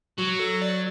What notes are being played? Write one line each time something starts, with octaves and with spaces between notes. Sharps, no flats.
F#3 F#4
A4
D5